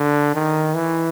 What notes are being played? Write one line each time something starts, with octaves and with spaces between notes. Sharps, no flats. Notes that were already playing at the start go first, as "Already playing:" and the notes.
Already playing: D3
D#3
E3